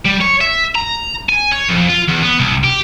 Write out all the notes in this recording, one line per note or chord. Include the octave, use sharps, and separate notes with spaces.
G3
C#5
E5
A#5
G#5
C#5
F2
F4
E2
B3
C2
G4